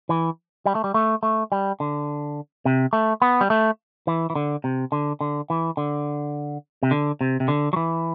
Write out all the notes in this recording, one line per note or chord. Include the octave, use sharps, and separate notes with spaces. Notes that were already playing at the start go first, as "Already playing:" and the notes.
E3
G3
A3
G3
A3
A3
G3
D3
C3
A3
B3
G3
A3
E3
E3
D3
C3
D3
D3
E3
D3
C3
D3
C3
C3
D3
F#3
E3